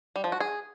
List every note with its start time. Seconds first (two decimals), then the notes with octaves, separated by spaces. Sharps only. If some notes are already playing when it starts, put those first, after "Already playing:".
0.16 G3
0.24 F3
0.32 F#4
0.40 G#4